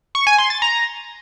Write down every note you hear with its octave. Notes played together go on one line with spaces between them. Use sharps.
C#6
G#5
C6
A6
A#5